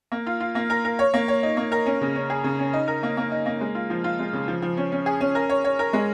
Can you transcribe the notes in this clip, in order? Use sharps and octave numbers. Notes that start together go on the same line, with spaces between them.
A#3
F4
F4
A#3
A#4
A#4
C#5
A#3
C#5
D#4
A#3
A#4
C#4
C#3
C#4
G#4
C#3
C#4
D#4
A#4
A#3
A#3
D#4
A#3
G#3
F4
F3
F4
G#3
C#3
F3
F3
C#4
C#4
G#4
C#4
A#4
C#5
C#5
A#4
G#3